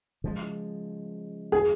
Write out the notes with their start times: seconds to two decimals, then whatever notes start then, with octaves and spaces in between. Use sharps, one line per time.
0.24 C#3 F3 G#3
1.52 G#4